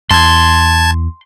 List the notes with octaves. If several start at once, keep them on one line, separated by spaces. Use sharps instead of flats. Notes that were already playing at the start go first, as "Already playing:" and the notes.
E2 A5 C6 G#6